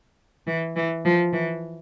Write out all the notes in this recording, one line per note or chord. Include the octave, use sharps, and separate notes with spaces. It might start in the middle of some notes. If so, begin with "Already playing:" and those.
E3
E3
F3
E3